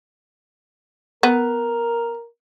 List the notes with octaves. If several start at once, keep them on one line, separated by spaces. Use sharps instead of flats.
B3 A#4